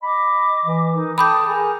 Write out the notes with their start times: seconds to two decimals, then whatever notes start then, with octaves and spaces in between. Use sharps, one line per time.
0.03 D#5 B5 D6
0.65 E3
0.92 D#4 A#4
1.18 A4 G5 A5 B5 D6 D#6 G6
1.48 G#4 A#4 G#5 A#5